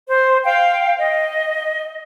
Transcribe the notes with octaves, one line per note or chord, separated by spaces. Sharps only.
C5
F5 G5
D#5